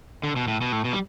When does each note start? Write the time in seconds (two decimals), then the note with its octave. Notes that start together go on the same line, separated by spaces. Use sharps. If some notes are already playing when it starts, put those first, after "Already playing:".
0.24 D3
0.36 B2
0.48 A2
0.61 B2
0.72 A2
0.85 B2
0.93 G3